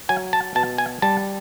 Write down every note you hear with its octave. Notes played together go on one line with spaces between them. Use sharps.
F#3 G#5
A5
B2 A5
G#5
G3 A5